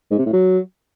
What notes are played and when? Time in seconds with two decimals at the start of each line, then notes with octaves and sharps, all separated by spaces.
0.11 G#2
0.18 C3
0.26 A2
0.33 F#3